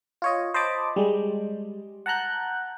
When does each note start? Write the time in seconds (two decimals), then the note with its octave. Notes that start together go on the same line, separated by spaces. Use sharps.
0.22 F4 C#5 D#5
0.54 C5 D#5 A5 B5 D6
0.96 G3 G#3
2.06 F#5 A5 A#5 F#6 G6